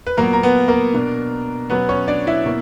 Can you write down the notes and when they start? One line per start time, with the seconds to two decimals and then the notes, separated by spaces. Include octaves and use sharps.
0.07 B4
0.17 A#2 F#3 A#3 B3 A#4
0.33 A#4
0.43 B3 B4
0.68 A#3 A#4
0.94 B2 A#3 D4
1.70 B2 F#3 B3 C#4 B4
1.89 C#4 C#5
2.08 D4 D5
2.27 E4 E5
2.46 B2 A#3